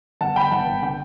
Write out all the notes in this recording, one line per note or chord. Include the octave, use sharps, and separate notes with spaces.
G1 F#5 A5
G1 G5 B5
G1 F#5 A5
G1
D3 G5